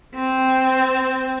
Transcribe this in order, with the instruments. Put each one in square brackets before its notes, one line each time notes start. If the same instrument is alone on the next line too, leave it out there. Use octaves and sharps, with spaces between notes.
[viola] C4